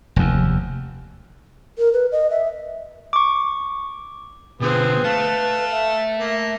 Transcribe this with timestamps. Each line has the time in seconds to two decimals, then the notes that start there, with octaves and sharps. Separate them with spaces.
0.16 F1 D#2
1.78 A#4
1.93 B4
2.12 D#5
2.30 E5
3.13 C#6 D6
4.61 B2 D3 F3 C4 G#4 B4
5.04 A3 F5 A5
5.70 E5
6.19 A#3